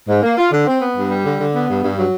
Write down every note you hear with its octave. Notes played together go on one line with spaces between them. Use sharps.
G#2
A#3
F4
D3
C4
B3
G2
G3
D3
D3
B3
G2
G2
F#3